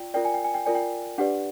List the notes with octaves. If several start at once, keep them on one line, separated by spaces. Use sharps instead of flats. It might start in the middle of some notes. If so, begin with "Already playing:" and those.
Already playing: F4 D5 G5
F4 A#4 D5 G5
G#5
G5
G#5
G5
F4 A#4 D5 G#5
G5
D4 G4 B4 D5 F#5